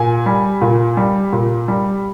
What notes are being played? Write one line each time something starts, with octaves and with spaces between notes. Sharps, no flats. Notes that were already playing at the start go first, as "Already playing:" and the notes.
Already playing: A#2 G#5
G3
A#2
G3
A#2
G3